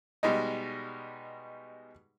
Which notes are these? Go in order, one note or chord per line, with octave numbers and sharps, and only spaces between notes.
B2 G3 G#3 D#4